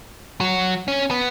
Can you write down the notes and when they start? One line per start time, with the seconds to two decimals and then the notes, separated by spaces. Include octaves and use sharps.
0.40 F#3
0.88 C#4
1.11 B3